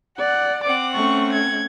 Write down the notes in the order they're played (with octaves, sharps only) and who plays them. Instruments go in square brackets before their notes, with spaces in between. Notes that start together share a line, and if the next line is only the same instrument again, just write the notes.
[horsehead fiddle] D5 [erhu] F#5
[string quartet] C4 F#5 [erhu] D6
[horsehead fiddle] A3 C#4 [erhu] C#6
[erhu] G#6